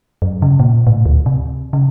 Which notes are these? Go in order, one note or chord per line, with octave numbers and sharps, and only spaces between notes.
F#2
C#3
A#2
A2
D2
C3
C#3